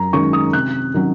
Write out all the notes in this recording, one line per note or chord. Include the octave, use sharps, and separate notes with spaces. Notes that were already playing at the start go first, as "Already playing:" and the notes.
Already playing: F#2 A#5
D#3 G#3 C#4 C#6
D#6
C3 F#6
D#3 F#3 C#4